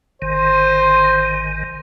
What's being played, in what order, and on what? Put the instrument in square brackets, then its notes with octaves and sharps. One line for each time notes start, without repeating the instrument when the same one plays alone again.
[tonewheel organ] G#1 D#3 [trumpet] C5